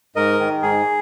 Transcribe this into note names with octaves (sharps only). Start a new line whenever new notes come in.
G#2 A#4 D#5
D#3
G#2 G#4